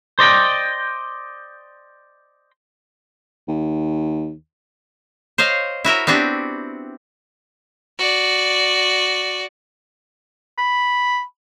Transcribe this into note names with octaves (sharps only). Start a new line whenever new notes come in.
C5 D5 D#5 G5
D#2
C5 C#5 D#5 F5
E4 F#4 A#4 E5
B3 C4 D4 F#4 G4
F#4 D5
B5